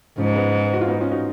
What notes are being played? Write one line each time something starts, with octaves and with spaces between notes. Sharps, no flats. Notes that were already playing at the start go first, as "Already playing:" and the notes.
G#2 C#3 F3
G#3 B3
F#4
F4
B3 D#4
C#4 F4
D#4 F#4